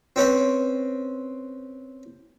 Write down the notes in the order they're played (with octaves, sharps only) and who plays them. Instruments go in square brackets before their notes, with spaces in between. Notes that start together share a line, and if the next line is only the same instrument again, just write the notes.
[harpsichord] C4 C#4 B4